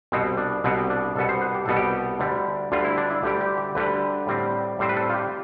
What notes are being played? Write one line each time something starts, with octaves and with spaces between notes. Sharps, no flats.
C2 B2 B3 C4
D4
C2 B2 B3 C4
D4
C2 B2 B3 A4
C5
B4
G4
C2 B2 B3 A4
G4
D2 D3 G3
D2 D3 G3 F4
E4
D4
E4
D2 D3 G3 G4
G4
G4
D2 D3 G3 B4
A2 G3 C4
A2 G3 C4 C5
B4
A4
F4
G4